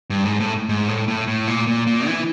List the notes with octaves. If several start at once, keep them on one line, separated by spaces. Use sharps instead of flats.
G2
G#2
A2
G#2
A2
A2
A2
A#2
A#2
A#2
E3